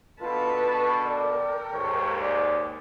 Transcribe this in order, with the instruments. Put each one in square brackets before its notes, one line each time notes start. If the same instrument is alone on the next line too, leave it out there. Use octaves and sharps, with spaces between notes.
[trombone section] B2 D4 A4 [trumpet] F4 [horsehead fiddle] B4 A5
[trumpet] C#6
[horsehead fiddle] A#4 G5 [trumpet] D5
[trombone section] D#2 G#2 [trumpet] C#5
[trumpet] D5